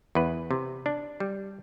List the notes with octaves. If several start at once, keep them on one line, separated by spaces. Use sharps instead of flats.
E2 B4
C3
D4
G3